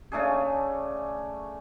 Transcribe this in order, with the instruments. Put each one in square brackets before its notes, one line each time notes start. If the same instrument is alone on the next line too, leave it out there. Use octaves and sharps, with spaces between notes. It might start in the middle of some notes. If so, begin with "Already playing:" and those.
[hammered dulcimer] C#3 A3 D4 G#4